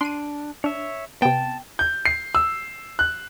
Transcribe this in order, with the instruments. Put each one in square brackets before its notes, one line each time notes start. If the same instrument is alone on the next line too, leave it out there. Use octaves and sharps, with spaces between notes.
[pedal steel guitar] D4 [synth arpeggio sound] C6 C7 D#7
[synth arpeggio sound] D4 [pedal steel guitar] C#5 E5
[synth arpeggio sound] C3 B3 [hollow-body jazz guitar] G5 [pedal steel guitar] A5
[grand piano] G6
C7
E6
F#6